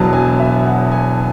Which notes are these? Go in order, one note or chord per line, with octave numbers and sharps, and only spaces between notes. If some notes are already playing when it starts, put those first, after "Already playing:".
Already playing: E1 E2 B2 F#3 A5
G#5
E5
F#5
G#5